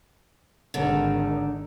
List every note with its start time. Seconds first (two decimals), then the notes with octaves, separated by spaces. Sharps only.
0.74 G#1 D3 D#3